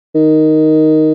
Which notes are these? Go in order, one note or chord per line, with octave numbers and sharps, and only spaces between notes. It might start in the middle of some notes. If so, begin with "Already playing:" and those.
D#3